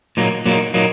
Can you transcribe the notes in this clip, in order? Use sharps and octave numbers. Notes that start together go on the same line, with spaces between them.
A#2 F#3 A#3 D#4
A#2 F#3 A#3 D#4
A#2 F#3 A#3 D#4